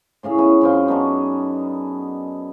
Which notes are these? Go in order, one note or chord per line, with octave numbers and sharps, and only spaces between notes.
A2 C#3 C#4 G#4
B3 E4 F#4 G#4
F#2 C4 F4
B3 D4 D#4 F#4